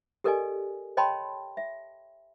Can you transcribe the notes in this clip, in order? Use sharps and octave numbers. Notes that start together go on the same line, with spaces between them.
G4 A4 A#4 D5 D#5 G#5
C#5 D#5 G5 A5 B5 C6
E5